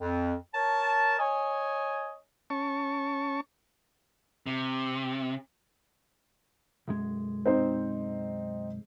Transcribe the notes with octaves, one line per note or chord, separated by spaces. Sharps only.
F2
A#4 C#5 A5
C#5 D#5 G#5
C#4 A5 C#6
C3
B1 F#2 G#3
C4 D#4 C5